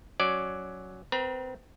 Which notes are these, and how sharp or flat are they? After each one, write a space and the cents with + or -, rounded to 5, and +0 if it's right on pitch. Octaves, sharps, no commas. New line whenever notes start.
F#3 +0 C#4 +0 D5 +0
C4 -30 B4 -40 A#5 +40